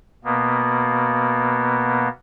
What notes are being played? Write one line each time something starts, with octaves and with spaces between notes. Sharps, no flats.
B2 A#3 B3